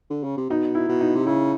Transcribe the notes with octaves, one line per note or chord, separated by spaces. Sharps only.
D3
C#3
C3
B2 D#4
E4
B2
D#4
C3
C#3 E4